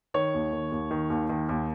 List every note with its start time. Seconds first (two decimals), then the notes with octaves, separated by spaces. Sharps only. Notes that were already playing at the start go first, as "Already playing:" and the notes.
0.14 D#3 C#5
0.34 D#2
0.52 D#3
0.72 D#2
0.91 D#3
1.10 D#2
1.29 D#3
1.49 D#2